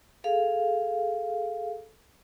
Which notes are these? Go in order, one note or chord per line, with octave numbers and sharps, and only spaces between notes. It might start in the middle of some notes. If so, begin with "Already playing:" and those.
G#4 A4 F5